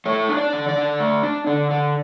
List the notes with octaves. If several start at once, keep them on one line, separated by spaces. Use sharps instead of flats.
A3 C#5
D4
D5
D3
D5
D3
A3
D4
D3
D3